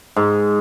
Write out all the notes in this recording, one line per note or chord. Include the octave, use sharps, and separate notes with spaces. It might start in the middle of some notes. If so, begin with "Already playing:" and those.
G#2